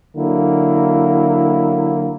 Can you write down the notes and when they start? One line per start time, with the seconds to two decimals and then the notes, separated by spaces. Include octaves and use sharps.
0.16 D3 F#3 A#3 E4